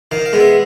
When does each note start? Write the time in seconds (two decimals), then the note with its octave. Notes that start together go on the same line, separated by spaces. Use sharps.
0.11 D#3 F5
0.26 F5
0.33 G#3 B3
0.40 E5